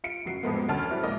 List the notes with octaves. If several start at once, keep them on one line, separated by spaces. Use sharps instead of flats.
F4 C#7 D7
F#1 F#3 F#4 C7
F2 A2 F3 G#3 A#3 B3
D2 F#3 G3 C#4 A5 F6
C4 E4 F#4 A4 D5
A#1 G#3 A#3 D#5 D6